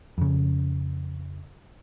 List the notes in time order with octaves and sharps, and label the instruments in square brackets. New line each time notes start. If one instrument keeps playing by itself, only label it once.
[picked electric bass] F2 C#3